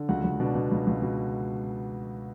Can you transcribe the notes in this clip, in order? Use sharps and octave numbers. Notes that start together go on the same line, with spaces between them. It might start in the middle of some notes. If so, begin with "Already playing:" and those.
Already playing: D3
C#2 F#4 F#5
C#2
B2 D4 D5
B2
C#2
C#2
B2